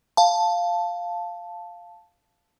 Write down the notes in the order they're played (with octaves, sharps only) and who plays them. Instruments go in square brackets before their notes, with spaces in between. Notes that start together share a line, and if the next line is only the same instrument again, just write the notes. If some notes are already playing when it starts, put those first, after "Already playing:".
[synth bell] F5 A5